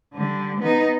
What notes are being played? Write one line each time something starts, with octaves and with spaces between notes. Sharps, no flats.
D3 G3
B3 D#4